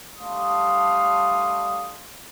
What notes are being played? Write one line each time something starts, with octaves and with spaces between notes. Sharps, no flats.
G3 A3 D4 F5 C6 D#6